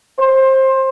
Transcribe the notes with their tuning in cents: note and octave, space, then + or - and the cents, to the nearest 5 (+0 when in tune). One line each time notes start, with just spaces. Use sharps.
C5 +20